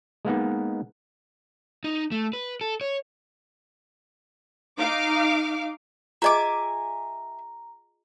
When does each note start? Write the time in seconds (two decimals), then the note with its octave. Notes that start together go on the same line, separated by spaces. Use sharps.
0.25 G#3 A#3 B3 D#4
1.84 D#4
2.11 A3
2.33 B4
2.61 A4
2.81 C#5
4.78 D#4 F5 D6
6.22 F4 G#4 D#5 E5 G#5 A#5 D6